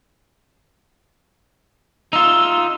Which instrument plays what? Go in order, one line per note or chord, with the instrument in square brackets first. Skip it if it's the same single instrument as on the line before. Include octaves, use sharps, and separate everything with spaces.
[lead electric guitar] D#4 F4 [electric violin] E6